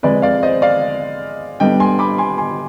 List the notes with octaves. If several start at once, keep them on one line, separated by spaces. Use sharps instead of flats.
C3 F3 G#3 B4 D5
D5 F5
C5 D#5
D5 F5
D3 G3 B3 D4 D#5 G5
G#5 C6
B5 D6
G#5 C6
G#5 C6